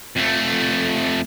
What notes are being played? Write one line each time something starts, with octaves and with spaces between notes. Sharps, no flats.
F2 A3